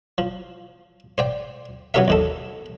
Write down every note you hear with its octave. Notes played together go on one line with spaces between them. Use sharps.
F3
C5 D5 G5
F#3 B3 C#4 G4 A#4 E5
D#2 D#3 A4